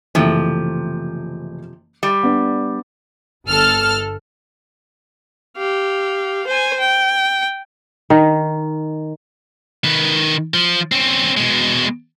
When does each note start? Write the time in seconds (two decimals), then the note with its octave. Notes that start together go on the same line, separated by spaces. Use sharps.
0.15 F#1 C3 E3 F3 A3
2.03 G3
2.23 B3 D4
3.47 G1 A4 F6
5.57 G4 F5
6.47 C5 G#5
6.80 G5
8.10 D#3
9.84 D#3 B4
10.54 F3
10.92 C4 C#4
11.37 B2 G#3